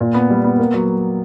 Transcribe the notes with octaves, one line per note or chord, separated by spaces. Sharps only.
A#2
B3
G3
B3
A#3
F#3